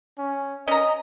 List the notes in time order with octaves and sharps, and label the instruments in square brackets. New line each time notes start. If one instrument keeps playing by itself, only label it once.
[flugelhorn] C#4
[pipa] C#4 A#5 [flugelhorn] D#5